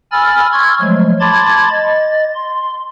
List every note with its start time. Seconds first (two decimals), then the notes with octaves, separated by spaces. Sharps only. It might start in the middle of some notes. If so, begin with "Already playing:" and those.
0.12 G#5 B5 E6 F6 A6
0.53 C6 C#6 E6 F6 G#6
0.81 F3 F#3 G#3 A3
1.20 A5 B5 C6 D6 G#6 A6
1.71 D#5 A6
2.35 C6